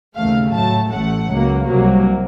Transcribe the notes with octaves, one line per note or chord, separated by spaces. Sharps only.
D#2 C#3 A3 F5
A2 F#3 A3 A5
A1 A2 A3 F#5
C#2 C#3 F#3 A#3
C2 C3 F#3 A#3